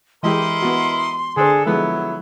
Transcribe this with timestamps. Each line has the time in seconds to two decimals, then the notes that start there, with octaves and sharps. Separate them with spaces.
0.23 E3 G#3 E4 G4 A#4 D#5 C6
0.62 B3 F#4
1.37 D3 D4 G#4 A4 C5
1.66 F3 F#3 G#3 B3 E4 A4